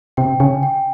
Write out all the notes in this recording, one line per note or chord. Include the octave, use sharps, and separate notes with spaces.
C3 G5
C#3 G#5
G5